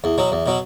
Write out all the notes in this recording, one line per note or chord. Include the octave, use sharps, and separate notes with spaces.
E2
B2 F#3
E2
B2 F#3